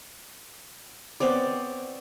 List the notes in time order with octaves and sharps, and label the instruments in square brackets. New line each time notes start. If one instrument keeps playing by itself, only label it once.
[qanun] B3 C4 C#5 D5